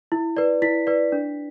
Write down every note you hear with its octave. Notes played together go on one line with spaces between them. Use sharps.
E4
B4 D5
E4 B6
B4 D5
D4